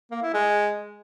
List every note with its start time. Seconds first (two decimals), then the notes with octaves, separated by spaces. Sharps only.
0.11 A#3
0.23 E4
0.34 G#3